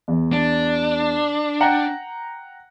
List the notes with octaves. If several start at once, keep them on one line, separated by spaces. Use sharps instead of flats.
E2
D4
F#5 G5 A#5